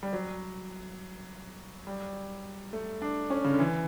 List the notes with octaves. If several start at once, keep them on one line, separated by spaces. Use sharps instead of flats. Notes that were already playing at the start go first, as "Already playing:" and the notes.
G3
F#3
G3
A3
D4
C#4
C#3
D3
E3